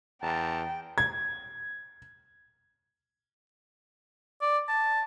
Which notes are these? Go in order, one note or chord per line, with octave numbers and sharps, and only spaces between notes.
E2 F#5 G5 A5 A#5
G#6
D5
A5